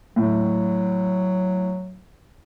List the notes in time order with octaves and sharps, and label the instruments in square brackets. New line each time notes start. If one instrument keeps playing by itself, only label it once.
[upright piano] A2 [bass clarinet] F#3